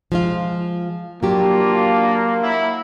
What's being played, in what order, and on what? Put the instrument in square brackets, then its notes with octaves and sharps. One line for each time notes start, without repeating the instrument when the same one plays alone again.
[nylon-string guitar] F3 G#3 F4
[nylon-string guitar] F#3 G4 [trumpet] A#3 [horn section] D4 F4
[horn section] F#3 E4